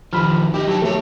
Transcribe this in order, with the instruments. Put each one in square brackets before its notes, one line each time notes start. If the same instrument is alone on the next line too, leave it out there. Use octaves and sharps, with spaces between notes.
[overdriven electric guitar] D#3 F3 [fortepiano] B5 F6
[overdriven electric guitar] D#4 E4 [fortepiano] G4
[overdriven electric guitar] F#3 A4
[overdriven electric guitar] E2 C#5 [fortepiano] A3